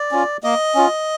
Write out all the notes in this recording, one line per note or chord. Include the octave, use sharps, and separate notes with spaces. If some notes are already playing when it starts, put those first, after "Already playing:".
Already playing: D5
C#4 F4
A#3 D#5
C#4 F4